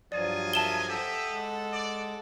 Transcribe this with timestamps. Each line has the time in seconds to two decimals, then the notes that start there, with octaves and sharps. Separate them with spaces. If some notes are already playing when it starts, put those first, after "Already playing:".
0.12 G2 F3 F#3 F4 D5 D#5 G#5
0.53 A#4 E5 A5 E7 G7
0.88 G4 A4 D#5 E5 F#5
1.30 G#3
1.72 D5